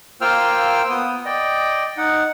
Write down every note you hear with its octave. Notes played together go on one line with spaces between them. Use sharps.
A#3 F4 C5 G5 E6 F6
B3 D#6
D5 D#5 G5
D#4 F#5